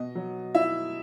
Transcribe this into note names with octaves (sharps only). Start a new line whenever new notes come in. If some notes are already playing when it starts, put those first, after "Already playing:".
Already playing: B2 D#5
F#3
E4 E5